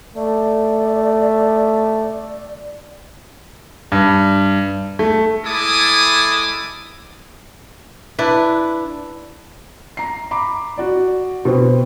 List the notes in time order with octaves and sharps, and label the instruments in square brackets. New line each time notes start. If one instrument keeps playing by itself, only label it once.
[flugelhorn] A3 [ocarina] D5
[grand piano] G2
A3
[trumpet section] G#3 E4 A4 G#5 D6 D#6
[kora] D4 E4 B4
[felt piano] A#5 C7
A#5 B5 D6
F#4 D5
B2 C4